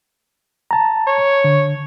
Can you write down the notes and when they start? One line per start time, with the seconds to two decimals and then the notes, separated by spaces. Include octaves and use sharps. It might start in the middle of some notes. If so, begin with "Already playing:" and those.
0.71 A5 A#5
1.07 C#5
1.44 D3